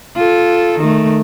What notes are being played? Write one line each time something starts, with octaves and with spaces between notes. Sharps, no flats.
F4 A4
D#3 A3